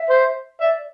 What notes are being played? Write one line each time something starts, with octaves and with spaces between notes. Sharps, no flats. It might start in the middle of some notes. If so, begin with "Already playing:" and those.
Already playing: E5
C5
D5 E5